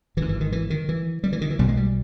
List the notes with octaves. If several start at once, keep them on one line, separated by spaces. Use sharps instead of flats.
G#1 G#2 E3
E3
D#3
E3
D#3
E3
G3
E3
D#3
E3
B1 B2 G3
G#3
G3